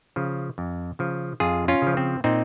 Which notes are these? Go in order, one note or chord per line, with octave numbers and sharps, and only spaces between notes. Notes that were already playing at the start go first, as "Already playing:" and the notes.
C#3 F3
F2
C#3 F3
F2 F4 G#4
C#4 F4
C#3 F3
C4
A#2 C4 D#4